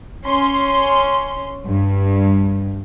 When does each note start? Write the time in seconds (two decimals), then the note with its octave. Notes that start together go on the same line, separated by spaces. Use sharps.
0.25 C#4 C6
1.67 G2